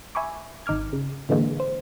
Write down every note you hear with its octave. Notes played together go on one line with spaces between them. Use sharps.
E5 G#5 B5 C#6 D6
G#1 D#4 D6 F6 G#6
C#3
A2 D3 E3 G#3 A#3
C5